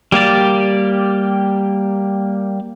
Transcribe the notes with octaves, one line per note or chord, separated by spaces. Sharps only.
G3 A#3 G4 D5